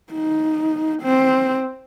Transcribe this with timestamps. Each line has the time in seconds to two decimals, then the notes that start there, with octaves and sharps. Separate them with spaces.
0.13 D#4
1.02 C4